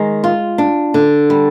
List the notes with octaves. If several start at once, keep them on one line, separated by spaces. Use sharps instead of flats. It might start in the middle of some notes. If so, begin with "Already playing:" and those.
Already playing: D#3 G#3
F4
D4
D3
G3